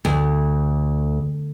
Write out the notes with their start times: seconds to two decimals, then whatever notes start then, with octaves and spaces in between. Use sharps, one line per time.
0.05 D2